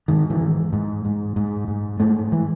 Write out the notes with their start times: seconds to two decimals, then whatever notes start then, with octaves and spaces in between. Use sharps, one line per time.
0.08 G#2 D#3
0.30 E3
0.41 G#2
0.73 G#2
1.05 G#2
1.36 G#2
1.68 G#2
2.00 G#2 A3
2.32 E3